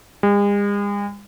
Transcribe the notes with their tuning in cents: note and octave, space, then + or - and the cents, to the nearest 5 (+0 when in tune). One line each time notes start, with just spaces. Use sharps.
G#3 -45